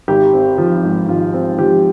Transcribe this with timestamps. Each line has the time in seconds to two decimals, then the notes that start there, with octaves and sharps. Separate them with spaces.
0.08 G#1 G4
0.33 C4
0.58 F3
0.83 G#2
1.08 G#1 F4
1.34 C4
1.59 F3 G4